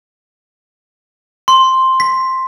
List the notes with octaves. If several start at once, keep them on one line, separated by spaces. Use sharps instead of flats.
C6
B6